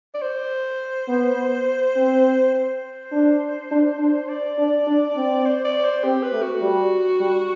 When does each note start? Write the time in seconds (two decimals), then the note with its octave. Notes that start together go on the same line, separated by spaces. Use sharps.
0.15 D5
0.22 C5
1.09 B3
1.96 C4
2.55 C5
3.12 D4
3.71 D4
4.00 D4
4.29 D5
4.58 D4
4.87 D4
5.16 C4
5.46 C5
5.65 D5
5.85 C5
6.04 C4 G4
6.23 B4
6.33 A3
6.43 F#4
6.62 G3
7.21 G3